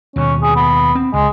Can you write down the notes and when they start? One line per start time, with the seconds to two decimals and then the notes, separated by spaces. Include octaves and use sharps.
0.16 D#2 B2 C#4
0.42 G#4
0.56 B3
0.95 C4
1.14 C#2 G#3